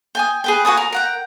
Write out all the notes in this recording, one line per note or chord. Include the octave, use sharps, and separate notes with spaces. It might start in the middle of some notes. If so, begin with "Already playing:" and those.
G5 G#5 D#6
G#4 B4 G5
F#4 B4 G#5 D#6
A#4
A#4 F#5 G5